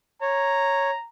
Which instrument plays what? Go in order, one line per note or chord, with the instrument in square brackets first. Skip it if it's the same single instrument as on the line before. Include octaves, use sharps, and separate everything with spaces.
[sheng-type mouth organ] C#5 [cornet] A#5